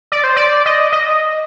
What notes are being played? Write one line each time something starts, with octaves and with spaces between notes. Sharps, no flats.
D5
C5
D5
D#5
D#5